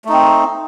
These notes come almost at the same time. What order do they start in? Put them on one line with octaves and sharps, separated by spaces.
A3 D#4 C4